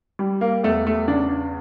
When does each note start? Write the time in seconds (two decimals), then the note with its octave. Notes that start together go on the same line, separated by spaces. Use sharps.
0.19 G3
0.41 A#3
0.63 E2 A3
0.87 A3
1.08 C#3 D4